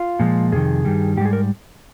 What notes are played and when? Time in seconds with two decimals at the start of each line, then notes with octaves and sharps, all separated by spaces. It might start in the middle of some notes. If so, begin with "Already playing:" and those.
Already playing: F4
0.20 A#2 F3 G#3
0.52 F2 C3 D#3 G#4
0.85 G2 D#3 G3
1.17 G#2 G4
1.21 G3 G#4
1.33 A#4